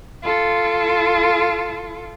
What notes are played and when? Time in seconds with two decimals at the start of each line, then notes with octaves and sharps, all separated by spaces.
0.23 F4 A4